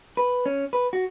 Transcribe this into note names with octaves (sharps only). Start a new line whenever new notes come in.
B4
C#4
B4
F#4